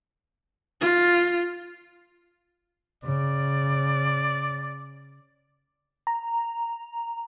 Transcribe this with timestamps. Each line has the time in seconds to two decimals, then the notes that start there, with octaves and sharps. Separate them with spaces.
0.81 F4
3.04 C#3 D5
6.07 A#5